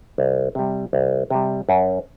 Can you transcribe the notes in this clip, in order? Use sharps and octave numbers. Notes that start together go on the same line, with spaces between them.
C2
C3 G3
C2
C3 G3
F#2